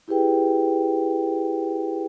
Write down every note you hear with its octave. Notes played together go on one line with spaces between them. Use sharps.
E4 G4 G#4 B4 G5